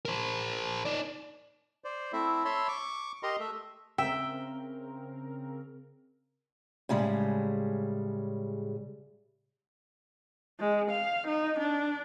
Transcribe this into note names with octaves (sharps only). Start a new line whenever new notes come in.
A#4 C5
D#4 D5
C5 D5
A3 C4 E4 E5
C#5 E5 A5 B5 C6
C#6 D6
G4 A#4 D#5 A#5 C6
A3 E5
C#3 C4 A#4 E5 G5
A2 C#3 G3 G#3
G#3
F5
D#4
D4